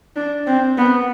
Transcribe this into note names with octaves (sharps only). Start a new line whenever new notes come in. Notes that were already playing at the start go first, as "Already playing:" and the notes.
D4
C4
B3